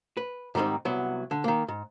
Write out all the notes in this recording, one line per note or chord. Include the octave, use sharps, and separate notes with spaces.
B4
G#2 D#3 G3 C4 D#4
C2 F#3 B3
D3
D#3 A#3
G#2